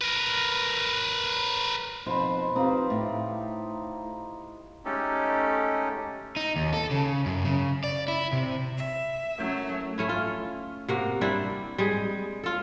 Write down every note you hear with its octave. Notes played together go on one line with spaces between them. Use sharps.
A#4 B4
F2 B2 D#4 C5 B5
C4 D#4 F4 G4 B4 D5
A2
G#3 A3 C#4 D#4 G4 A4
D#4
D#2
A4
C#3
F#2
C#3
D5
E4
C3
E5
F#3 A3 C#4 E4 A#4
A3 C#4 E4
F4
C3 A#3 F#4
G3 C4 D4 E4
G3 G#3 G#4
F4 A4